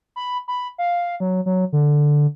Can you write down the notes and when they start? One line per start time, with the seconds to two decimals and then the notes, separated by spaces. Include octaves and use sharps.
0.16 B5
0.48 B5
0.78 F5
1.20 F#3
1.46 F#3
1.73 D3